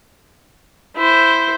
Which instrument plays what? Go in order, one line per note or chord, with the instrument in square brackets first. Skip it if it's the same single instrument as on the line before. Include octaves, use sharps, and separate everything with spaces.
[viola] E4 C5